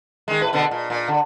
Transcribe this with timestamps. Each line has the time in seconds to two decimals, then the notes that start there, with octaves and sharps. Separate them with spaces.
0.28 D#3 G#3
0.41 A2 B4
0.53 B2 D3 B3
0.71 A#2
0.90 A#2
1.08 D3